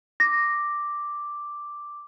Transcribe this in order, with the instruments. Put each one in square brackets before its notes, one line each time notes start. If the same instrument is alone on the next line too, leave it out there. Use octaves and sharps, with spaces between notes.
[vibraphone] D6 [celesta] A#6